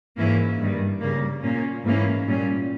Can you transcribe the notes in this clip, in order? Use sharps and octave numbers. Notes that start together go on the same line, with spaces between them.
G#2 E3 A#3 C#4 E4
G2 D#3 G3
C#3 G3 A#3
A#2 A#3 C#4
G#2 E3 A#3 C#4 E4
A#2 G3 C#4